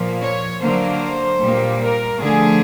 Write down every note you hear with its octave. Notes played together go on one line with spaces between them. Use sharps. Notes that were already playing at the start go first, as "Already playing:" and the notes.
Already playing: A#2 F3 A#3
C#5
D3 F#3 A#3 C5
A#2 G3 A#3
A#4
D3 F3 A3 G#4